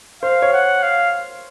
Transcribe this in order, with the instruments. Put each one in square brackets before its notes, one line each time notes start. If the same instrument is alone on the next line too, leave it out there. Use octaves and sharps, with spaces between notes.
[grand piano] C5 [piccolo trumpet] F5
[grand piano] C#5
[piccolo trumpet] F#5
F5